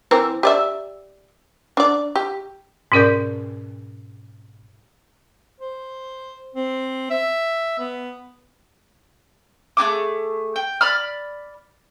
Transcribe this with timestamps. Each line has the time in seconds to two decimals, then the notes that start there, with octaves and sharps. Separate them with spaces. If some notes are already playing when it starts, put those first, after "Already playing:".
0.11 E3 C4 A#4
0.43 G4 D5 E5
1.77 D4 D5
2.16 G4
2.92 G#2 B2 C#4 A#4 D5 G6
5.60 C5
6.55 C4
7.10 E5
7.79 B3
9.77 A3 F4 G#4 D6
10.56 G5
10.81 D5 B5 F6